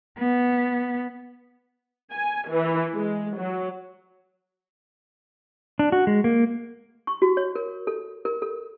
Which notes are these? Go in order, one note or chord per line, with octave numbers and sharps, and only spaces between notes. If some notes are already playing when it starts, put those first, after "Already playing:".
B3
G#5
E3
G#3
F#3
D4
F#4
G#3
A#3
C#6
F#4
C#5
A#4
A4
A#4
A4